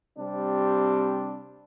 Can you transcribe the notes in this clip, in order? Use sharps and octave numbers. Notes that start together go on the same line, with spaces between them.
C3 G3 C4 D4